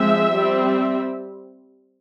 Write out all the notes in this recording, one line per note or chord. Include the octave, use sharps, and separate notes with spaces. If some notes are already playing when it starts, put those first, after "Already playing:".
Already playing: F3 G#3 C4 E5
G3 C4